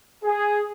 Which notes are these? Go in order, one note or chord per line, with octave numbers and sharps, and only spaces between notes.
G#4